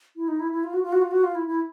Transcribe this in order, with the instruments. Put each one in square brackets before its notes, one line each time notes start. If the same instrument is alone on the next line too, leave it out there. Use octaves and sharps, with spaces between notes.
[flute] E4
D#4
E4
E4
F4
F#4
F4
F#4
F4
F#4
F4
E4
E4